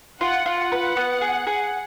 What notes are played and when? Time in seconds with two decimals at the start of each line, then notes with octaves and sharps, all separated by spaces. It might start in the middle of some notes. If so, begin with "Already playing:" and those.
0.20 F4 F#5
0.46 F4
0.58 F#5
0.72 B4
0.97 B3
1.21 G#4
1.47 G#4